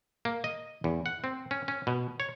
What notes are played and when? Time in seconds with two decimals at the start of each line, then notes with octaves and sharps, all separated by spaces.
0.25 A#3
0.44 D#5
0.84 E2
1.06 F#5
1.24 C4
1.51 C#4
1.68 C#4
1.87 B2
2.20 C#5